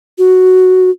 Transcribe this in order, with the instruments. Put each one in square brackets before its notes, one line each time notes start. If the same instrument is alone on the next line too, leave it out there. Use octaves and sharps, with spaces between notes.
[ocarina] F#4